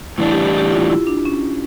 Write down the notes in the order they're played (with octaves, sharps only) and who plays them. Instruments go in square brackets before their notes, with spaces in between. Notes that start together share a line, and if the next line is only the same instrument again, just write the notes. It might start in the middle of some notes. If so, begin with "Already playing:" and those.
[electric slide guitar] A2 E3 G3 D4 [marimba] E4
[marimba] G4
G4
G4
F4
E4
D4
C#4